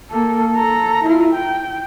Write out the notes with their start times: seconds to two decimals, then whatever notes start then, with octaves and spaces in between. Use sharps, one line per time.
0.10 A#3 A4
0.56 A4 A#5
1.04 E4 F4
1.34 G5